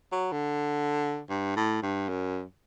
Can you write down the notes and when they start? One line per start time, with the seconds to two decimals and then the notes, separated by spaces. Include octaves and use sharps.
0.12 F#3
0.32 D3
1.30 G2
1.56 A2
1.83 G2
2.09 F#2